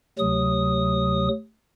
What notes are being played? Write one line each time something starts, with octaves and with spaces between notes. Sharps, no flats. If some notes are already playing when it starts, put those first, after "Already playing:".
D2 C3 F#3 D#6